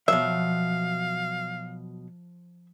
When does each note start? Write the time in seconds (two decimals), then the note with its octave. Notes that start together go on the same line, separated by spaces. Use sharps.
0.08 B2 F3 F#3 E5 F5